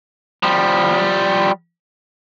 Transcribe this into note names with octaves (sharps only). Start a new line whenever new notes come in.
F3 G3